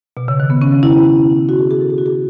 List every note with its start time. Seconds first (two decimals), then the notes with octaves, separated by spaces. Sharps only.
0.17 B2
0.28 C#3
0.40 D#3
0.50 B3
0.62 C#4
0.72 C#4
0.83 E4
1.49 F#4
1.59 G#4
1.71 G#4
1.81 A4
1.90 G#4
1.98 F#4
2.06 G#4